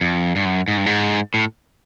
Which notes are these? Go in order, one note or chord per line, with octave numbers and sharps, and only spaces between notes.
F2
G2
F#2
G#2
G2
G#2
A2